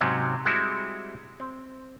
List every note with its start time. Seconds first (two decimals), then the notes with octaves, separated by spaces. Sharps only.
0.01 G#2 C3 F#3 C4 C#4
0.45 G3 G#3 C4 E4 F#4
1.40 C4